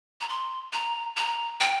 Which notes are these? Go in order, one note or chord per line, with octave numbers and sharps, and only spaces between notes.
A#5
C6
A#5
A#5
G5